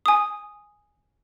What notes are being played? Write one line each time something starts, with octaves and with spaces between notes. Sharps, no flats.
G#5 D#6